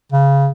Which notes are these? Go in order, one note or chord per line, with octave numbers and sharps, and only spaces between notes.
C#3